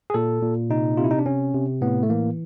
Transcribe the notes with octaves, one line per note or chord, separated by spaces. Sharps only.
G#4
A#2 A4
A#2
C3 D#4
C3 F4
E4
D#4
D4
C3 C#4
C3
A2 B3
A3
E3 A#3